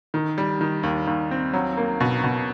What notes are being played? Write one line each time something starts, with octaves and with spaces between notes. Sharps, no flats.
D#3
G3
D#3
D#2
D#2
C4
F#3
A#3
B2
B2